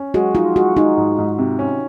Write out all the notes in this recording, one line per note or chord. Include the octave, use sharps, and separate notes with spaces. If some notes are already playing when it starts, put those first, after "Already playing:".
Already playing: C#4
G#3 F#4
D#4 F4
G#3 F#4
G#3 D#4
G#2
G#2
C3
C#4